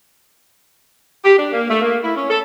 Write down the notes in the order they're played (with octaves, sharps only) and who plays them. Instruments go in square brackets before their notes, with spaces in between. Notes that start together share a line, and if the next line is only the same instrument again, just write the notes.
[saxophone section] G4
D4
A#3
A3
A#3
E4
C#4
A4